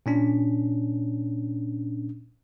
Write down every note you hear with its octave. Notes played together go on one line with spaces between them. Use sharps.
A#2 C#4 D4